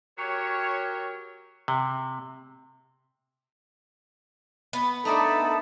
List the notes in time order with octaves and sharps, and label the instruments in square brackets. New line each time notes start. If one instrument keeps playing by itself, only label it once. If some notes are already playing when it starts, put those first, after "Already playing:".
[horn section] F#3 G4 A#4 C#5
[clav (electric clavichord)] C3
[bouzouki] B3
[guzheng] A3 D4 A#4 [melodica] D#4 B5 [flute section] A4 A5 D#6